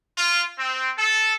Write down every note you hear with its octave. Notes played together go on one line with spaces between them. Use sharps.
F4
C4
A4